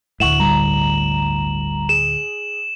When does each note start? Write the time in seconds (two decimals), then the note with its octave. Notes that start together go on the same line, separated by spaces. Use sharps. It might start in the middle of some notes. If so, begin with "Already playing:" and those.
0.20 D2 A2 E5 F#5 C#6 E7 F#7
0.39 G1 G3 A#5
1.89 G#4 E7